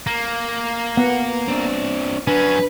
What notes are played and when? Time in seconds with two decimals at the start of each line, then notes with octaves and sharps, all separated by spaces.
0.07 A#3
0.97 B3 F#5
1.48 C4 D4
2.27 F#3 C#4 D4 B4